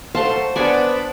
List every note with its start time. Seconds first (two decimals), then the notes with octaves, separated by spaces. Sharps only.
0.15 F#3 A3 C5 F5 A5 C6
0.56 B3 D4 D5 G#5